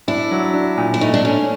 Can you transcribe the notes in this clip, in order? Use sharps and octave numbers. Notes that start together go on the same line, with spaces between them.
D4 E4
F#3
D4
A#2
E4
A3 D#4
D4
A3 C#4